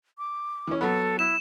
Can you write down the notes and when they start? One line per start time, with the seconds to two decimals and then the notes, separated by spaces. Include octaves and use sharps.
0.18 D6
0.67 E3 C#4
0.81 F#3 B3 A4
1.19 E4 E7